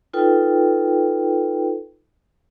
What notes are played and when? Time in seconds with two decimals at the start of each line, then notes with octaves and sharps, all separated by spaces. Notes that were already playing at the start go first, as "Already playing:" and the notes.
0.13 D#4 F4 A4 B4 G5